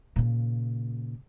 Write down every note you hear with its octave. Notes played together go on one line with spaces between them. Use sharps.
A#2 C#3